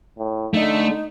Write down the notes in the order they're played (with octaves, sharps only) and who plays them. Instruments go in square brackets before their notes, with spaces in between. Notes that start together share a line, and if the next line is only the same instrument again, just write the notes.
[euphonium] A2
[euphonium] D3 [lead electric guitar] A3 [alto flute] D#4